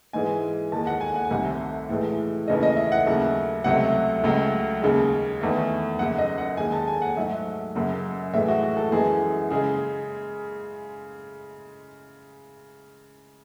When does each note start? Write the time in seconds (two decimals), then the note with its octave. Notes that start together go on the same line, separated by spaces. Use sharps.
0.13 G#2 E3 G#3 G#5
0.72 D#2 D#3 G#3 A5
0.87 F#5
1.01 G#5
1.16 F#5
1.25 G#5
1.31 C2 C3 D#3 A3 F#5
1.89 A2 E3 G#3
2.47 D#2 C#3 E3 A3 D#5
2.63 D#5
2.77 E5
2.92 F#5
3.06 D#2 C#3 F#3 A3
3.64 C#2 C3 F#3 A3 F#5
4.23 C#2 C#3 F#3 A3
4.82 D#2 C#3 G#3
5.41 E2 D#3 A3
5.99 F#2 C#3 F#3 F#5
6.18 D#5
6.38 F#5
6.57 D#2 D#3 G#3 G#5
6.72 A5
6.88 G#5
7.02 F#5
7.17 G#2 F#3 A3 E5
7.75 F#2 C#3 F#3
8.33 A2 E3 G#3 E5
8.48 F#4
8.63 F#4
8.77 A4
8.92 F#2 E3 G#3 G#4
9.50 C#3 G#3 G#4